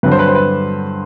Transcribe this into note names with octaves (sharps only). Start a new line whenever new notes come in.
G2 D3 F#3 B4
C5
B4
C5
B4